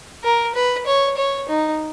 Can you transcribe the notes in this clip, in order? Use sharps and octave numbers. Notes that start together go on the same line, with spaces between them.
A#4
B4
C#5
C#5
D#4